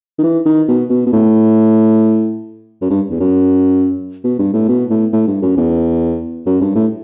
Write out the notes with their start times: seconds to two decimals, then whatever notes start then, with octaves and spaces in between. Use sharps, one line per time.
0.19 D#3
0.24 E3
0.46 D#3
0.68 B2
0.90 B2
1.07 B2
1.13 A2
2.82 F#2
2.91 G2
3.10 E2
3.20 F#2
4.24 B2
4.39 G2
4.53 A2
4.69 B2
4.91 A2
5.13 A2
5.27 G2
5.42 F#2
5.57 E2
6.46 F#2
6.61 G2
6.76 A2